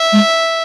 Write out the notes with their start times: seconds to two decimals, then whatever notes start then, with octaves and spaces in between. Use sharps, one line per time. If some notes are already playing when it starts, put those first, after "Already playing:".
Already playing: E5
0.13 G#3